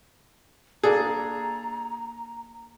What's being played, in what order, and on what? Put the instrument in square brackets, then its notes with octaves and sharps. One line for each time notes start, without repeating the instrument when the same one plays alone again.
[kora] A#3 D4 A4 [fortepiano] G#4 [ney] A#5